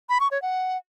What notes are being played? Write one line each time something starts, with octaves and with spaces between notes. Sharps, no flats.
B5
C#6
C#5
F#5